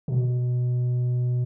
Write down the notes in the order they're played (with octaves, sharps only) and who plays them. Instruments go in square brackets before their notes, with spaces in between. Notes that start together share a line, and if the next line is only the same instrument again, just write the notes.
[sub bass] B2